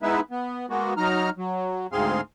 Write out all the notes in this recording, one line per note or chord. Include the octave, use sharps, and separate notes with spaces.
G#3 B3 D#4 E4 B4 E5
B3
G#3 A#3 B3 F#4
F#3 D#4 A#5 F6
F#3
D2 G#2 C4 G#4 F5 C6